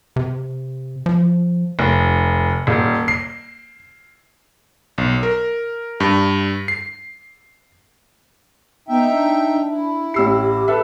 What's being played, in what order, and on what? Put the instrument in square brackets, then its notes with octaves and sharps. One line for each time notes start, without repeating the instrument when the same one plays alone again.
[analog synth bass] C3
F3
[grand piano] F1
D#1
C7
[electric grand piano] B1
A#4
G2
C7
[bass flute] B3 [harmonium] D#4 E5 G5
[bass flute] D4
[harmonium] E4
[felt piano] A1 E6 C7 [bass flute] G4
[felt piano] A4 B4 E5